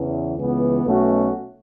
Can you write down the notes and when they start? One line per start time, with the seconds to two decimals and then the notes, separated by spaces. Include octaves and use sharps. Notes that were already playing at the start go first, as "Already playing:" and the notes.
Already playing: E2 C#3 E3
0.36 C#2 C#3 E3 B3
0.84 B1 B2 A3 C#4 F#4